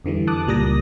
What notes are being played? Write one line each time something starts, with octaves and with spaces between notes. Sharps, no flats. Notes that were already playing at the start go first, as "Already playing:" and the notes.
F2 D3 E3 G3
A5 D6 D#6 F#6
C#2 A#2 G3 A#4 D#6 A#6